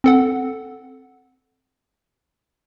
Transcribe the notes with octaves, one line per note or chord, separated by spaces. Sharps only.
C4 A4 F#5